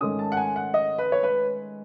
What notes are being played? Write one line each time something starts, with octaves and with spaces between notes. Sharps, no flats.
G#2 D#3 A3 C#4 D#6
A5
F#5
G#5
F#5
D#5
B4
C#5
B4